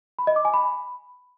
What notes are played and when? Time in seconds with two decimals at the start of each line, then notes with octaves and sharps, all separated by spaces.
0.19 B5
0.27 D#5
0.36 D6
0.45 G#5
0.54 B5